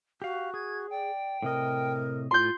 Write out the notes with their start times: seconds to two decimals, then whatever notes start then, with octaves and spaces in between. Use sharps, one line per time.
0.22 F#4 G4 F5
0.54 G#4 G#6
0.90 D5 G5
1.42 A2 C3 A#4 D#5
2.31 A2 F4 C6 G6